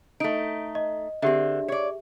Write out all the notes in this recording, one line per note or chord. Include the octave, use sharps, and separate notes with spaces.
A3 D#4 D7
D#5
D3 C4 G4 G#4 E5
C#5 D5